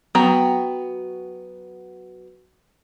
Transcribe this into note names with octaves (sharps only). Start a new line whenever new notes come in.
F#3 B3 F#4 G5 A#5